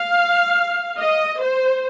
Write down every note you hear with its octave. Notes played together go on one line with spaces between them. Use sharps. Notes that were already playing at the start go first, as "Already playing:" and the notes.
Already playing: F5
D#5
C5